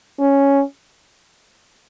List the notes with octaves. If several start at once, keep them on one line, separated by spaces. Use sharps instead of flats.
C#4